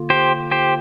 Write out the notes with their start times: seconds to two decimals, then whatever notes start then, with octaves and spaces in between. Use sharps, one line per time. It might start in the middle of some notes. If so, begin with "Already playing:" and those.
Already playing: D3 A#3 F4
0.10 G4 C5
0.51 G4 C5